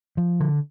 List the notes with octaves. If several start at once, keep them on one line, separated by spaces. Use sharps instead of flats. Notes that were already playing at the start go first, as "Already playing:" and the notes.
F3
D3